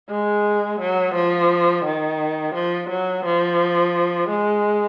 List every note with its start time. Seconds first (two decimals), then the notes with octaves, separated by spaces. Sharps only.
0.11 G#3
0.81 F#3
1.15 F3
1.86 D#3
2.55 F3
2.90 F#3
3.26 F3
4.30 G#3